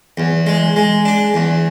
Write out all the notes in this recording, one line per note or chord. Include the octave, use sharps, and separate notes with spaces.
E2
G#3
G#3
D4
E2